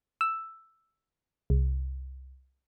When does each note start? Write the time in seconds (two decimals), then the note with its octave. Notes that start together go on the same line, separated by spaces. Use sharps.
0.21 E6
1.50 C2